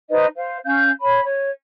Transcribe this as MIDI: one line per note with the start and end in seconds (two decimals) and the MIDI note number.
0.10 0.26 63
0.10 0.26 71
0.10 0.26 72
0.10 0.26 75
0.36 0.57 72
0.36 0.57 77
0.65 0.90 61
0.65 0.90 77
0.65 0.90 91
1.00 1.22 73
1.00 1.22 83
1.23 1.48 73